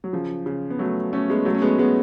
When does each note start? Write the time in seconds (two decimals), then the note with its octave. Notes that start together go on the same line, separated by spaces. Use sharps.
0.04 F#3
0.13 C#3 F3
0.46 C#3
0.70 B3
0.79 F#3 A3
1.13 A3 C#4
1.29 G#3 B3
1.45 F#3 A3
1.54 C#4
1.62 G#3 B3
1.78 G#3 B3